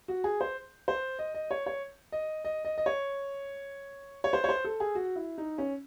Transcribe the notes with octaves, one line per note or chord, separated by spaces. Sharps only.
F#4
G#4
C5
C5
D#5
D#5
C#5
C#5
D#5
D#5
D#5
D#5
C#5
C#5
C5
C#5
C5
A4
G#4
F#4
E4
D#4
C#4